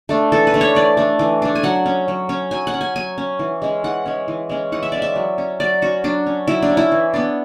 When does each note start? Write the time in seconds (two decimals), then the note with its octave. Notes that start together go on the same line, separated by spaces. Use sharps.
0.09 A3 D4
0.32 E3 A4
0.47 B4
0.54 A3 D4
0.61 C#5
0.75 E3 D5
0.97 A3 D4
1.19 E3
1.42 A3 D4
1.55 G#5
1.63 F#3 F#5
1.86 C#4
2.08 F#3
2.29 C#4
2.51 F#3 G#5
2.67 F#5
2.74 C#4
2.81 G#5
2.96 F#3 G#5
3.18 C#4
3.39 E3
3.62 G#3 C#4
3.84 E3 F#5
4.06 G#3 C#4
4.28 E3
4.49 G#3 C#4
4.72 E3 F#5
4.83 E5
4.92 G#3 C#4 D5
5.02 E5
5.16 F#3
5.38 C#4
5.60 F#3 D5
5.82 C#4 F#4
6.04 F#3 D4
6.26 C#4
6.48 F#3 E4
6.62 D4
6.70 C#4
6.77 E4
6.92 E3
7.14 B3 D4